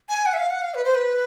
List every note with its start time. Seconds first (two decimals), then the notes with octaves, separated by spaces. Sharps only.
0.09 G#5
0.26 F#5
0.34 E5
0.38 F5
0.50 F#5
0.62 F5
0.74 B4
0.84 C5
0.95 B4